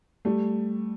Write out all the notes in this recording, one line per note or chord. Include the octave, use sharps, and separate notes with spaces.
G3 A3